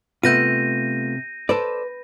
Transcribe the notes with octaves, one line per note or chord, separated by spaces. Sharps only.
C3 A3 B3 F4 G6 A#6 D#7
A4 B4 C5 D5